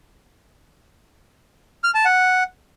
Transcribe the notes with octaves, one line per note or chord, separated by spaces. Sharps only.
F6
A5
F#5